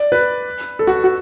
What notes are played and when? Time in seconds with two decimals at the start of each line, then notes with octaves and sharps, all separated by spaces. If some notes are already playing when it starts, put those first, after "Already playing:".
Already playing: D5
0.12 B4
0.79 A4
0.87 F#4
1.04 F#4